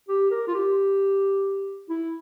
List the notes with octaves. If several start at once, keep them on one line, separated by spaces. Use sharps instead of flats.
G4
A#4
F4
G4
E4